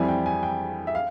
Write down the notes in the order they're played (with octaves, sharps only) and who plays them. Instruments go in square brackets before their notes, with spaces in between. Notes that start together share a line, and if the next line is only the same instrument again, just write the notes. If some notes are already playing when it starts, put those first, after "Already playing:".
Already playing: [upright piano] F2 E3 G3 C4 E4 G#5
G5
G#5
G5
E5
F5